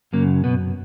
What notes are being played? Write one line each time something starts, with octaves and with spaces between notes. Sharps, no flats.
F#2 C#3 F#3 A#3
B2 B3